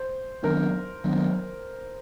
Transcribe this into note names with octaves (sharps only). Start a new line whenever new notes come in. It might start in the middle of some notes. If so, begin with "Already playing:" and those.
Already playing: C5
D#3 F#3 B3 D4 A#4
D#3 F#3 B3 D4